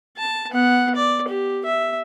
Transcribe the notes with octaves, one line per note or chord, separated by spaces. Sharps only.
A5
B3 F#5
D5
G4
E5